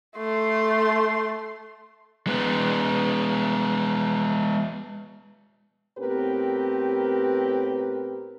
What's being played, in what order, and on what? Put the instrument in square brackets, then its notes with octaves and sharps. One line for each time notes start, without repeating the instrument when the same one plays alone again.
[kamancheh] A3 C6
[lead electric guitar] G#3 B3
[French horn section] A2 B3 C4 G4 A#4 B4